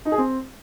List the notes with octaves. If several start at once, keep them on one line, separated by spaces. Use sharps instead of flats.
D#4
G#4
C4